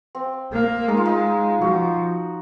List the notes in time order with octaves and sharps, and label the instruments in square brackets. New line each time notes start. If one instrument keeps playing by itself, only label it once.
[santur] C4
[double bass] A#3
[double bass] G#3 [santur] D#4
[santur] F4
D#4
[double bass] F3 [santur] F#4